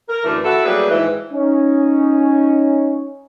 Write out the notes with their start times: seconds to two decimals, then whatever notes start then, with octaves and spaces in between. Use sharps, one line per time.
0.09 A#4
0.24 F#2 D3 E3 A3
0.44 E4 F#4 A4
0.65 F#3 G3 A3 A#3 G#4 B4
0.90 G#2 E3
1.33 C#4 D#4